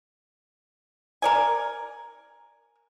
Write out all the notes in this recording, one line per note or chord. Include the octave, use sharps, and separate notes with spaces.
A#4 D5 G#5